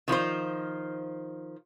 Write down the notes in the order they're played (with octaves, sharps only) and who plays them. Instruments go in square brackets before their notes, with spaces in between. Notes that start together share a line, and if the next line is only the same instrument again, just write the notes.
[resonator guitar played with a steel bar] D#3 F3 F4 C5